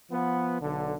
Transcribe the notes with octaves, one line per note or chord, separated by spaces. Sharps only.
F3 B3
B1 D3